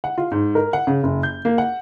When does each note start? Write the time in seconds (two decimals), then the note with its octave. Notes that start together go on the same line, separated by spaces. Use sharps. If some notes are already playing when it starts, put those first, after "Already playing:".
0.04 F#5
0.18 F4
0.32 G#2
0.55 A#4
0.73 F#5
0.87 C#3
1.03 F#1
1.23 G6
1.45 A#3
1.58 F#5